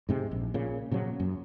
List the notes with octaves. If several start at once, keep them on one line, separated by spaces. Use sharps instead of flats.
G#2 C3 G#3
A#1
A#2 C#3
A#2 C#3 F3 F#3
F#2